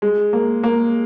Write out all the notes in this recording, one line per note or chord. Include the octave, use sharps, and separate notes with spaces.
G#3
A#3
A#3